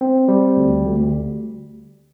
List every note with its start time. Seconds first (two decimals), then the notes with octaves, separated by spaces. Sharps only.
0.01 C4
0.28 G3
0.57 D2
0.85 D2